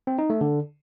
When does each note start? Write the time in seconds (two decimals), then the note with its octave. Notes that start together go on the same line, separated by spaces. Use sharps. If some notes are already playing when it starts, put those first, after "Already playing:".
0.07 C4
0.18 D#4
0.30 A3
0.41 D3